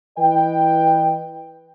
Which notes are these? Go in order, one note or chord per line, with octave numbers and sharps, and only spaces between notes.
E3 B4 D#5 G5